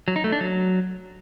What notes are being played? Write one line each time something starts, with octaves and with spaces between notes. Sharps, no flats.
F#3
D#4
A3
D4
F#3